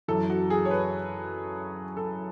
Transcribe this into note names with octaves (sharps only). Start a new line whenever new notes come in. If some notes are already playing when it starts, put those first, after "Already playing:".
F#2 E3 A4
F#4
G#4
C#5
B4
A4